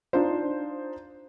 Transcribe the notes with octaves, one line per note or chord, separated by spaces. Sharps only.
D4 D#4 F4 C5